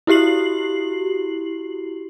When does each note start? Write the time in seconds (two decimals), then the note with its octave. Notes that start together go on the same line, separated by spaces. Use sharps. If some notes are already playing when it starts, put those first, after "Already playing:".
0.07 E4 F#4 G4 C7 F#7